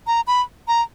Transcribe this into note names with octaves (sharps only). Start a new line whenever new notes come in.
A#5
B5
A#5